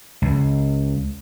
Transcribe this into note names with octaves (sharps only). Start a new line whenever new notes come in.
C#2